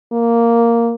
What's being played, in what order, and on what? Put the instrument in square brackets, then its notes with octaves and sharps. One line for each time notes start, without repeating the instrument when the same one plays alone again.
[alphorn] A#3